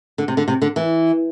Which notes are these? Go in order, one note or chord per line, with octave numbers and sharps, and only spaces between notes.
D3
C3
D3
C3
D3
E3